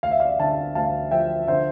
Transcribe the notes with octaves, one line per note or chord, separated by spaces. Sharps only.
D2 F5
E5
D5 F5
D3 F5 A5
D2 F5 A5
F3 E5 G5
D3 C5 E5